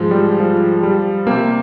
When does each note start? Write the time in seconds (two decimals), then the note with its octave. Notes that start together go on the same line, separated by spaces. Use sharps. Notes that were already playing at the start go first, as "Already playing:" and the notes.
Already playing: G#2 D#3 F3 G#3
0.11 G3
0.40 F3
0.83 G3
1.27 C3 G3 A#3 C4